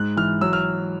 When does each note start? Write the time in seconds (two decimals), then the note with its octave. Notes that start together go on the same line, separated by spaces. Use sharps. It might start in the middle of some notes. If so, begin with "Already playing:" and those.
Already playing: G#2 F#6
0.17 E3 F6
0.41 F#3 E6
0.53 F6